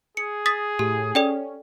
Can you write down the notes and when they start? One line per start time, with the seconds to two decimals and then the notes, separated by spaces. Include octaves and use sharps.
0.17 G#4 C#7
0.46 D#6 A6 B6
0.79 A2 G4
1.15 C#4 A4 D5 G5